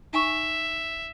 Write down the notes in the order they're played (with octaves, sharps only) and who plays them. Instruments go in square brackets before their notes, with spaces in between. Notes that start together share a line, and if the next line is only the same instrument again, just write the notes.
[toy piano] D#4 G#5 C#6 [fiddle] E5